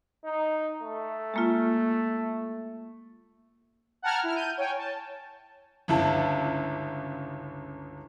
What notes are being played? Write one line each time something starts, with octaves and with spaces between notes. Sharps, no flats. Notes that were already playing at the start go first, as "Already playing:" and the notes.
D#4
A3
G#3 A#3 F4
F#5 G5 A5 A#5 F6 G#6
E4 F6
G6 D#7
C#5 G5 G#5
A5
G1 C#2 E4 A5